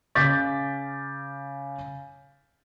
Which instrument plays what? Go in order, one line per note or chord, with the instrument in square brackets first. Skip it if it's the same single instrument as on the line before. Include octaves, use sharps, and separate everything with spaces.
[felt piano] C#3 D6 G6 A6 B6